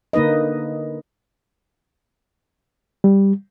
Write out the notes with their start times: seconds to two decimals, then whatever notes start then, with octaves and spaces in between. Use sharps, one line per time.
0.13 D3 A#3 D#4 B4 D#5
3.04 G3